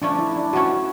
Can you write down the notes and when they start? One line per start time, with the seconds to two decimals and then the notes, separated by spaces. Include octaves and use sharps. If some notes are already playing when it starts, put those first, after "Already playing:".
0.02 F3 A3 C#4 D4
0.19 E4
0.36 D4
0.53 F3 A3 C#4 F#4